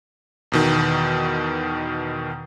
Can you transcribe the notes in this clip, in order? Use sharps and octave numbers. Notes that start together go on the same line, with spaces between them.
E2 B2 D#3